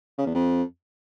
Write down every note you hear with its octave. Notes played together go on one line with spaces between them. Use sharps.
C#3
E2
F2